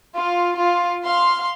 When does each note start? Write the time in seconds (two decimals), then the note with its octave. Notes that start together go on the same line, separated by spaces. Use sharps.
0.16 F4
0.58 F4
1.05 F5 C6